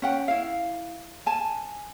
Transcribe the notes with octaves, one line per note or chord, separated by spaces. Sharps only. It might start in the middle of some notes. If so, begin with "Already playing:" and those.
C#4 F#5 G5
E4 F5
G#5 A5